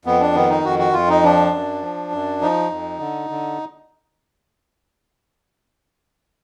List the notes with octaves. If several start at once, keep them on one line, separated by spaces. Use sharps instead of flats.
F2 B3
D4
D#3 B3
D#4
F2 F#4
F#4
F2 F4
D#4
F3 D4
F#2
F3
F#2
F3 D#4
F2
D3
D3